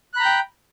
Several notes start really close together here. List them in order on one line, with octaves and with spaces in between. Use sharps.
F#6 B5 A#5 G6 G5